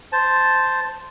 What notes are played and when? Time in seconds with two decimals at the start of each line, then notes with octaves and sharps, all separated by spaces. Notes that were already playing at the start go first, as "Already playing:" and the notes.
0.12 C5 A5